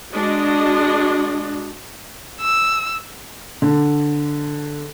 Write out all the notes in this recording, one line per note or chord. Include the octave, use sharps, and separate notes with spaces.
G#3 D4 F#4 D#5
E6
D3